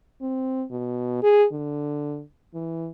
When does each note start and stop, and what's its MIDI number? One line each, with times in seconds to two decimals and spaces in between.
0.22 0.64 60
0.71 1.22 47
1.22 1.45 68
1.52 2.22 50
2.54 2.90 52